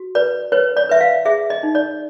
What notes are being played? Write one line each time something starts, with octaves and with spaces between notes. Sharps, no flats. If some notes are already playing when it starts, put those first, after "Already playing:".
Already playing: F#4
B4 D5
B4 C#5
D5
B4 E5
F5
G#4 E5
D#5
D#4
D5